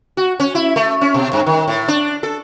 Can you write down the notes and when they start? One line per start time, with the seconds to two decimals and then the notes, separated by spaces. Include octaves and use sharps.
0.17 F#4
0.40 C#4
0.55 E4
0.76 A3
1.01 C#4
1.14 B2
1.33 G2
1.46 D#3
1.68 A2
1.88 D4
2.23 A4